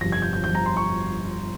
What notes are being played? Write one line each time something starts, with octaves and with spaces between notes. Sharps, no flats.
G1 F2 C3 A#6
G#6
G6
G6
G1 F2 C3 G6
A#5
C6
C#6